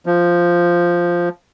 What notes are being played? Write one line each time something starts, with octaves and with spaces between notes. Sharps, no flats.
F3